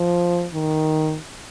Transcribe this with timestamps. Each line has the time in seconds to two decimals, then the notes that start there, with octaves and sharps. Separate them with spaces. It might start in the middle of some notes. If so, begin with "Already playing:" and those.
Already playing: F3
0.54 D#3